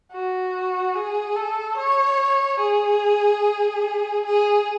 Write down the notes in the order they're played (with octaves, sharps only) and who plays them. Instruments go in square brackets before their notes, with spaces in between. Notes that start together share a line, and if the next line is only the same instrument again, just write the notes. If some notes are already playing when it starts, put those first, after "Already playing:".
[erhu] F#4
G#4
A4
C#5
G#4
G#4